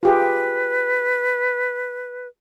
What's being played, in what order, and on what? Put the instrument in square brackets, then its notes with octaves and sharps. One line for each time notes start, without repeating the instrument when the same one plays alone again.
[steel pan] F4 G4 G#4 [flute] B4